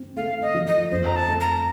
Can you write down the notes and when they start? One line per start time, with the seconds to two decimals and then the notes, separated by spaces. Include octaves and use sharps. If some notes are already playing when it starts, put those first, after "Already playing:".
Already playing: C4
0.16 A3 F5
0.42 D#5
0.54 F3
0.67 D#5
0.91 F2 C5
1.06 A#5
1.16 A5
1.28 A3
1.40 A#5